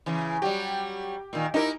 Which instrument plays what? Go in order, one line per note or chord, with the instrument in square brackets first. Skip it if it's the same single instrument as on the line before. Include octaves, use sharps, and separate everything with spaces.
[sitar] C#3 E3
[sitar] F#3 G3 [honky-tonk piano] G4
[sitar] A#2 D#3
[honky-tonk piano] D#4 A#4 [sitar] E4 G4